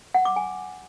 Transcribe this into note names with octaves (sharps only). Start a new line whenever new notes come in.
F#5
D6
G#5